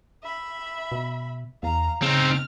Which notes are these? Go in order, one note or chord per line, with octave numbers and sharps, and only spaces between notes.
E5 B5
B2
E2 F5 A#5
C#3 C4 D#4 F6